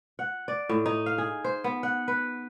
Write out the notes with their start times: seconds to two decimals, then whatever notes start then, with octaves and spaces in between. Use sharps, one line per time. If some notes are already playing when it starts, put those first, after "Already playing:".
0.19 F#5
0.48 D5
0.69 A2
0.86 D#4
1.06 F5
1.18 G#4
1.44 C5
1.64 B3
1.83 F#5
2.08 B4